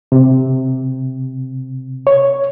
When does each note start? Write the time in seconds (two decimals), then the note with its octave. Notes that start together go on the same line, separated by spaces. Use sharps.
0.12 C3
2.07 C#5